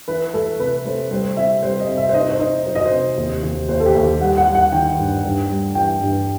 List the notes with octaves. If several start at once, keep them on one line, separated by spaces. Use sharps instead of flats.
E3 B4
A3 A4
C3 B4
A3 C5
G3 C5
C3 E5
G3 C5
D#5
C3
E5
C5
D#4 D#5
C5
D#4 D#5
F#3 C5
D#5
C5
C3
D#2
D#2
D#2 C5
A4
G4
D#2
G3 F#5
F#5
G3
F#5
D#3 G5
G2
G2
G3
E3 G5
G2